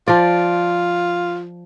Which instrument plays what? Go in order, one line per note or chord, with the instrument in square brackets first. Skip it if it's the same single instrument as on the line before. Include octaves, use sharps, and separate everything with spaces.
[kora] F3 D5 [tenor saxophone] F4